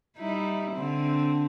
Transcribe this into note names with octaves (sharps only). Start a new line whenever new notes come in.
G3 D#4 E4
D3 C4